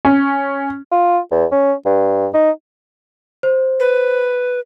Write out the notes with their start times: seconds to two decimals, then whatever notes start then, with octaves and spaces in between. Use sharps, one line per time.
0.05 C#4
0.92 F4
1.31 E2
1.52 C#4
1.86 G2
2.34 D#4
3.43 C5
3.80 B4